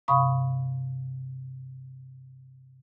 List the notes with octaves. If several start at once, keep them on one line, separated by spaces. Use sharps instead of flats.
G2 C3 F5 B5 C#6 D#6